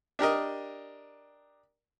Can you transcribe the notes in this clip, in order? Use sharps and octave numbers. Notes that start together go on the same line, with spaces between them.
D4 G4 A#4 D#5